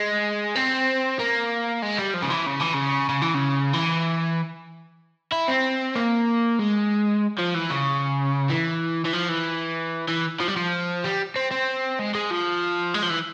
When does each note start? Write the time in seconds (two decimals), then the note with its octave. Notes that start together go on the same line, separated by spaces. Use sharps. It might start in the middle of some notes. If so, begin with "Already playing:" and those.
Already playing: G#3
0.55 C4
1.19 A#3
1.82 G#3
1.99 G3
2.14 F3
2.22 C#3
2.30 E3
2.46 C#3
2.60 E3
2.74 C#3
3.10 C#3
3.22 E3
3.34 C#3
3.73 E3
5.32 E4
5.48 C4
5.96 A#3
6.59 G#3
7.38 F3
7.54 E3
7.70 C#3
8.50 E3
9.05 E3
9.13 F3
9.29 E3
10.09 E3
10.40 F3
10.48 G3
10.56 F3
11.04 G3
11.36 C4
11.51 C4
11.99 G#3
12.15 G#3
12.31 F3
12.94 G#3
13.03 F3
13.10 E3